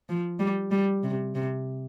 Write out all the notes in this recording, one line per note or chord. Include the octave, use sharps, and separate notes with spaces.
F3
G3
G3
C3
C3